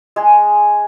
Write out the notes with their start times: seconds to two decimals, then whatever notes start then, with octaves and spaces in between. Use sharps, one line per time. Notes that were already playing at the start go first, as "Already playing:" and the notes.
0.16 G#3 G#4